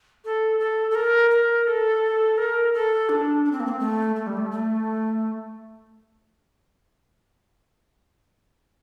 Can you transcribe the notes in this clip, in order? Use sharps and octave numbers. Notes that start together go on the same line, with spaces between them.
A4
A4
A4
A#4
A#4
A4
A#4
A4
D4
D4
C4
A#3
C4
A3
A3
G3
A3
A3